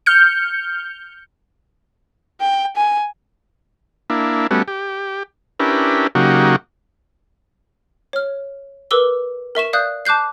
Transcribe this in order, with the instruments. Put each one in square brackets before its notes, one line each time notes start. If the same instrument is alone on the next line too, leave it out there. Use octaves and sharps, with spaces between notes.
[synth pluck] F6 G6 C#7
[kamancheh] G5
G#5
[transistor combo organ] A#3 D4 E4
G3 A3 B3 C#4 F#4
G4
C#4 D4 E4 G4 A#4 B4
C#3 F#3 A#3 D#4 F#4 G4
[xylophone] C#5 F6
A#4 B4 D6 E6 G7
A#4 E5 C#6 E7
D5 F5 D#6 F#6 G6
A5 D6 F#6 G6 C7